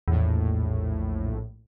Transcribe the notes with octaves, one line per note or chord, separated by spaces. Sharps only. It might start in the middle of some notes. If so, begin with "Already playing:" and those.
A#1 E2 A2